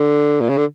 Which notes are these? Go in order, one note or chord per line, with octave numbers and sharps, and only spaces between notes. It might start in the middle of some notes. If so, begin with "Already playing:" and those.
Already playing: D3
A#2
C#3
D3